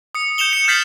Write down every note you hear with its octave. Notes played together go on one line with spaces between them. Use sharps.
D#6 C#7
G6 C#7 E7 F7 G7
C#7 E7
F6 G6 A6 B6 C7 F#7